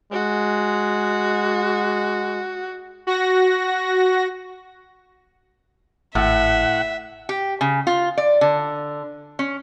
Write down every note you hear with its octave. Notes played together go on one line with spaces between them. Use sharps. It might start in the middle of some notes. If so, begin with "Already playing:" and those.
G#3 F#4
F#4 A#6
G#1 A2 E5 F#5
G4
C#3
F4
D5
D3
C#4